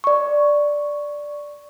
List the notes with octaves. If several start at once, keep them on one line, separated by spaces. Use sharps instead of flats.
D5 C#6